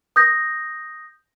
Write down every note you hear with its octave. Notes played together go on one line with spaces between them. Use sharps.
D#6 G6 A#6